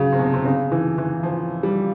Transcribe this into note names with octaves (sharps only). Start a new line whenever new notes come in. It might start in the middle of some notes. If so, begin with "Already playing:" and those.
Already playing: C#3 F#3
C3
B2
C3
C#3
E3
E3
F3
G3